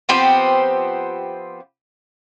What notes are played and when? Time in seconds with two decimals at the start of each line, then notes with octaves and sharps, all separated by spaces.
0.09 F3 B3 C4 G4